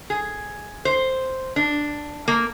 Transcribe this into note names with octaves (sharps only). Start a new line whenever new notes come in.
G#4
C5
D4
A#3